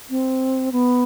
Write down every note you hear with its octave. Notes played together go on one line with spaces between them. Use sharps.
C4
B3